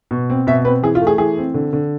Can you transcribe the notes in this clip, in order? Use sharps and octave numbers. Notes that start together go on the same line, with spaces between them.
B2
C4
B2 E5
C4 B4
E3 G#4
F4
A3
G#4
E3 G#4
C4
D3
D3